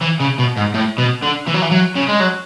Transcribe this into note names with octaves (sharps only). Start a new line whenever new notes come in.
E3
C#3
B2
G#2
A2
B2
D3
E3
F#3
E3
F#3
C#3
G#3
F#3